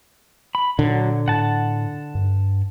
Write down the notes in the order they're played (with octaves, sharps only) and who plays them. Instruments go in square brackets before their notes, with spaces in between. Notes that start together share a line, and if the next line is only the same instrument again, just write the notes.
[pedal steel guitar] B5
[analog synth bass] A#2 [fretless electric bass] D3 [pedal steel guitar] F#3
[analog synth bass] A2 [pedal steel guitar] F#5 A5
[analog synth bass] G2